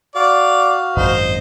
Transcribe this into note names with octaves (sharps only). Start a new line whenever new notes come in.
F#4 D5 F5
G#1 F#2 A#2 C5 D#5